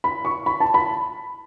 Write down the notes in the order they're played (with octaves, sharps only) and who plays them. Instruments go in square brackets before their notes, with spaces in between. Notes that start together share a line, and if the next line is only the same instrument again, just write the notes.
[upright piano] B5
C#6
B5
A5
B5